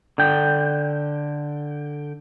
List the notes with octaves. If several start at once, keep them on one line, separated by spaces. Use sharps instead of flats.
D3 G5